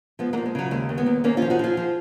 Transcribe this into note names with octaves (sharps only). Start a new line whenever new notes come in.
F3 G#3 B3
F#3 A#3
F3
G#3
C#3 F#3
D#2 G#3
D#2
G#3 B3
D#2
D#2 A#3 C#4
C#4 F4
F3
D#4 F#4
F3 F4 G#4
F3